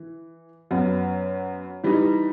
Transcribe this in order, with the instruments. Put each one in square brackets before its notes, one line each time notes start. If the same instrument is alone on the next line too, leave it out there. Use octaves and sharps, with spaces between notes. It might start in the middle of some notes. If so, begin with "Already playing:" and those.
Already playing: [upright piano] E3
F#2 F#3 B3
E3 G3 D#4